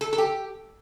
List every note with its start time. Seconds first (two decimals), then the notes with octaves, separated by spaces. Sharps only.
0.01 A4
0.13 A4
0.18 G4